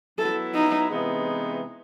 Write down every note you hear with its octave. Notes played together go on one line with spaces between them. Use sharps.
F#3 B3 E4 A4
D#4
C3 E3 G#3 B3 D#4